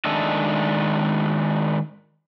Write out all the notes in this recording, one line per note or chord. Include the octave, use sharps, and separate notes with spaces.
D#3 G#3 D4 A4 D#5 E5